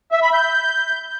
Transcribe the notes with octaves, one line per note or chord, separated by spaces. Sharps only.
E5
B5
G6